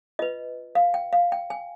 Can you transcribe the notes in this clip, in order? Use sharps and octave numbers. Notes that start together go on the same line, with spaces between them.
F4 B4 D#5
F5
G5
F5
G5
G#5